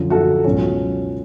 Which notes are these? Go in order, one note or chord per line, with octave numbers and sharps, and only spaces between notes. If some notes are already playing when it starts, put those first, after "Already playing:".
Already playing: F#2 D3 F3
F#4 A4
C#2 B2 F#3 C#4